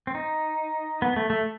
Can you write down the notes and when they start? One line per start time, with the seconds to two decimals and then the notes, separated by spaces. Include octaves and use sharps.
0.07 C4
0.15 D#4
1.02 B3
1.16 A3
1.30 A3